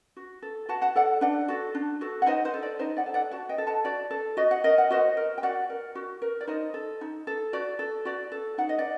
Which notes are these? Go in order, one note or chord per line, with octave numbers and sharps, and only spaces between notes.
F#4
A4
F#4 F#5 A5
F#5 A5
A4 D5 F#5
D4 D5 F#5
F#4 A4
D4
F#4 A4
F#5
D#4 C5 D#5
C5
A4
D5
D#4 C5 D#5
D5 F#5
A4
D5 F#5
F#4 F#5 A5
D#5 G5
A4
F#5 A5
F#4 D5
A4
F#4 D#5
F#5
A#4 D#5
F#5
F#4 C5 D#5
A#4
G5
F#4 D5 F#5
A#4
F#4
A#4
D5
D#4 C5 D#5
A4
D#4
A4
F#4 D5
A4
F#4 D5
A4
D#4 F#5
D#5
D5 F#5